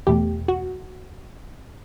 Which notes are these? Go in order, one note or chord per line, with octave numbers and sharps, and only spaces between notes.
E2 B2 A3 G4
F#4